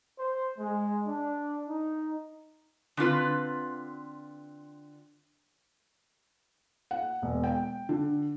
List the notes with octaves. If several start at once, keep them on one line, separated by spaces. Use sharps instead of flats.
C5
G#3
D4
D#4
D3 C4 F4 B4
F#5
E1
G5
D3